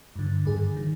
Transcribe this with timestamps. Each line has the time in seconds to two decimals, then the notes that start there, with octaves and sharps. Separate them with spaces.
0.16 G2 D3
0.46 G2 D3 G#4
0.76 D#3